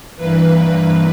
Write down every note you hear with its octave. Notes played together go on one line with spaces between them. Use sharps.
G2 E3 A#3 B4